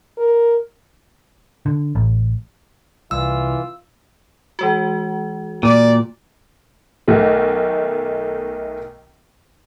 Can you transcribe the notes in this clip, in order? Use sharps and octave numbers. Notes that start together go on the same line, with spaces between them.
A#4
D3
A1
C2 E3 F4 E6
E3 G#3 F#4
A#2 D5
B1 D#3 A3